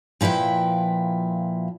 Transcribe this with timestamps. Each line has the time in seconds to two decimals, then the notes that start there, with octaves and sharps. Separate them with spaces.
0.21 A#2 F3 E4 B4 G5